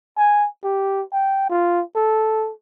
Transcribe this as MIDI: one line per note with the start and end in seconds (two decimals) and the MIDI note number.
0.17 0.47 80
0.64 1.03 67
1.13 1.49 79
1.50 1.83 65
1.96 2.52 69